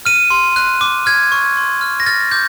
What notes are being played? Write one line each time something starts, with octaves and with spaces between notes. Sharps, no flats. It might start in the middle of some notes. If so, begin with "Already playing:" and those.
F6 D#7
C6
F#6
D6
F6 G#6
C#6
C6
F6
A#6
F6 A6
D6 G6